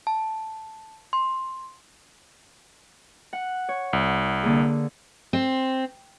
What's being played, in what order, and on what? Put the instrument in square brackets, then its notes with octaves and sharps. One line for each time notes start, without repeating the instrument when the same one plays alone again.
[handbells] A5
C6
[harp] F#5
C#5
[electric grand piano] C2
[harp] D3 A#3 G#4
[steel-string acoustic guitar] C4